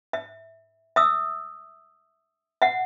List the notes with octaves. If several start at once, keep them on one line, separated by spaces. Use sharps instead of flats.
E5
E5 D#6 E6
E5 F#5